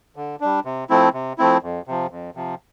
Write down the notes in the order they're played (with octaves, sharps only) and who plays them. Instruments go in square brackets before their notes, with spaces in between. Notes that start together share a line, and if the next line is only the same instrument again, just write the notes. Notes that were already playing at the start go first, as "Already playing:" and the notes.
[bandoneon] D3
G3 D4
C3
F3 A3 C4 E4
C3
F3 A3 C4 E4
F2
C3 F3
F2
C3 F3